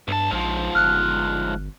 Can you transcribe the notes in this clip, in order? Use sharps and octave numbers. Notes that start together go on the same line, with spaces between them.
B1 G2 A5
A#1 G#2 F3
G1 F6 F#6